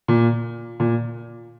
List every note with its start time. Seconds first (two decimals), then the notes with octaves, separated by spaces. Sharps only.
0.08 A#2
0.80 A#2